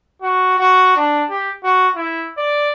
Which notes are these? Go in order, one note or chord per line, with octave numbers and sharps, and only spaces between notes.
F#4
F#4
D4
G4
F#4
E4
D5